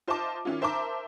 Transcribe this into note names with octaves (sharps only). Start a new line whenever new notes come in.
F4 C5 D#5 E5 A5 D6
D#3 C#4 E4 F4
A#4 C5 E5 A5 A#5 D6